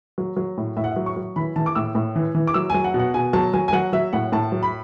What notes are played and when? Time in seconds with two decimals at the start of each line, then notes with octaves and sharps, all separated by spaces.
0.18 F#3
0.37 F#3
0.57 A2
0.76 A2 E5
0.84 F#5
0.91 E5
0.96 F#3
1.06 C#6
1.16 F#3
1.36 E3 B5
1.56 E3 A5
1.66 D6
1.75 A2 E6
1.95 A2
2.16 E3
2.35 E3
2.47 D6
2.54 F#3 E6
2.70 F#3 G#5
2.84 F#5
2.94 B2
2.99 F#5
3.14 B2 G#5
3.33 F#3 A5
3.53 F#3 G#5
3.68 G#5
3.73 F#3 F#5
3.93 F#3 E5
4.13 A2 F#5
4.32 A2 A5
4.52 F#3
4.63 B5